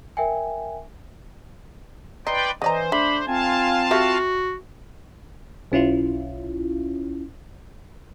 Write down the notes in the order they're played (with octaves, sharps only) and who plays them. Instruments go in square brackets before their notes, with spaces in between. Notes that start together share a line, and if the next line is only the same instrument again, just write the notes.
[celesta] A#4 E5 G5 G#5
[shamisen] D#4 [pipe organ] B4 D5 G5 [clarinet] C6
[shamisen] D3 D5 A#5 [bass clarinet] E3 [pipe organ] C5 [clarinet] D#5
[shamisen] A3 [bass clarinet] D4 [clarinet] B5
[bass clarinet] C4 [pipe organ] F4 F5 A5 [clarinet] G#5
[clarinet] F#4 [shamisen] G4 A4 E5
[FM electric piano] B1 C#4 E4 F4